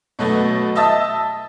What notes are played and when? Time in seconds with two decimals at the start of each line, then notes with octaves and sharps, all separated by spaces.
0.19 B2 F#3 A3 B3
0.75 D#5 E5 A5 D#6 E6 A6